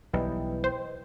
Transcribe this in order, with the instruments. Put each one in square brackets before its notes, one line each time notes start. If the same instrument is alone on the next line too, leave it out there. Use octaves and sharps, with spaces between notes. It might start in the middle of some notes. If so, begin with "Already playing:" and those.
[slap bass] B1 [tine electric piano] E3 G3 E4 [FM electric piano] B4 D#5 G5
[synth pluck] C5